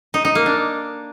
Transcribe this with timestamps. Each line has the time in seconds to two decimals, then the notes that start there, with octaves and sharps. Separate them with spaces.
0.14 D#4
0.25 D#4
0.35 A#3
0.46 D4